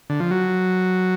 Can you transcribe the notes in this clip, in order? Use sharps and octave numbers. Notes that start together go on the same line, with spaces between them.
D3
F3
F#3